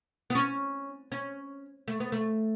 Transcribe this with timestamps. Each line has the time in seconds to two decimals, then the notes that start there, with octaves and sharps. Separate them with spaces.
0.30 B3
0.35 C#4
1.12 C#4
1.88 A3
2.00 B3
2.12 A3